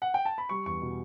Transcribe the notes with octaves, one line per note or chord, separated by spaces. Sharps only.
F#5
G5
A5
B5
G3 C#6
E2 C#6
B2